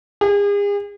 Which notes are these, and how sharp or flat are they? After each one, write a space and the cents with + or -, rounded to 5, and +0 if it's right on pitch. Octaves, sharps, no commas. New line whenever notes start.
G#4 -40